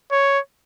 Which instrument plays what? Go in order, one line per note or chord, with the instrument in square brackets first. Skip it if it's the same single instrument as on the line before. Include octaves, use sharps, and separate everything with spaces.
[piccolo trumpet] C#5